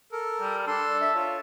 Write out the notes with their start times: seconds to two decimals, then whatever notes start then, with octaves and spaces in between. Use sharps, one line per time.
0.12 A4 A#4
0.41 G3
0.67 D4 A4 C6
1.01 E5
1.15 F4 C#5